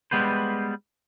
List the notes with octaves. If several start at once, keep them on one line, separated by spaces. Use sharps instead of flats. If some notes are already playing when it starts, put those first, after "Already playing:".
G3 G#3 B3 B4 C5